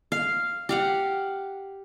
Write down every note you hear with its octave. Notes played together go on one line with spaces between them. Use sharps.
F5
G4 F5 F#5